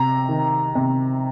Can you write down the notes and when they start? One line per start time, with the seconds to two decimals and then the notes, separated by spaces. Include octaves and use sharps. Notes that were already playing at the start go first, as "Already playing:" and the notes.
Already playing: C3 A#5
0.29 D#3
0.75 C3